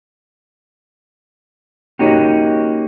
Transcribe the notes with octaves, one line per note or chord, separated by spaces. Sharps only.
A#3 C#4 D#4 F#4 G4